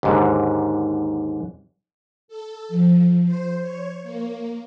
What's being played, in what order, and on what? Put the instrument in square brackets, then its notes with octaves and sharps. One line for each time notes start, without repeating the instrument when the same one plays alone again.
[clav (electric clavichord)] D#2 G#2 D3
[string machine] A4
F3
C5
C#5
A#3